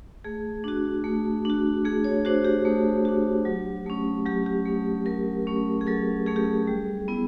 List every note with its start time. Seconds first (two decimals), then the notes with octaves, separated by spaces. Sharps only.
0.24 A3 G#4
0.64 D4 F#4
1.04 A3
1.45 D4 F#4
1.85 A3 G#4
2.04 C#5
2.25 D4 F#4 C5
2.45 G4
2.65 A3
3.05 D4 F#4
3.45 F#3
3.86 A3 C#4
4.25 F#3 G4
4.46 G4
4.66 A3 C#4
5.06 F#3 A#4
5.47 A3 C#4
5.81 G#4
5.87 F#3 A4
6.26 A3 C#4 G#4
6.36 G4
6.44 G#4
6.67 G3
7.08 B3 E4